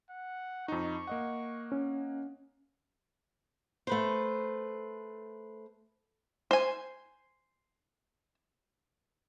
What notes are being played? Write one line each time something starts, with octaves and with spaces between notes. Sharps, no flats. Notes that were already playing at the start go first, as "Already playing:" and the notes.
F#5
F2 D#4 C#6
A#3 D#5 F#5
C#4
A3 B4 C5
C5 G#5